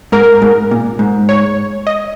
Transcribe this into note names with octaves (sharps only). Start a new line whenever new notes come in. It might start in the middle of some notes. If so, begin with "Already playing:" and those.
G#2 A#4
G#2
A#2
G#2
C#5
D#5